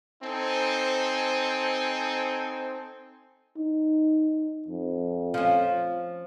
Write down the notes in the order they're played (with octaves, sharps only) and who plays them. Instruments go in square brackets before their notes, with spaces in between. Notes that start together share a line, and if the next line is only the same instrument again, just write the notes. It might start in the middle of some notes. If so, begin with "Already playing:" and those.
[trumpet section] C4 D#4 A4 C5 G#5
[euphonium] D#4
F2
[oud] F3 C#4